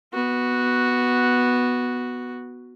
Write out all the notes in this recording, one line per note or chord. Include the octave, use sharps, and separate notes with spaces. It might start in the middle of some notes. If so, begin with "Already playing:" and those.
B3 F#4